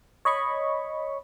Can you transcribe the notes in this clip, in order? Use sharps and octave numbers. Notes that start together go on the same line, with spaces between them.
C#5 D#5 B5 C#6